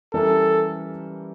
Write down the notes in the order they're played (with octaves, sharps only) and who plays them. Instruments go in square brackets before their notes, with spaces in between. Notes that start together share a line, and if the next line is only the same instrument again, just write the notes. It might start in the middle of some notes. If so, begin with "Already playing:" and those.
[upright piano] E3 G3 C#4 G4 A#4 [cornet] A4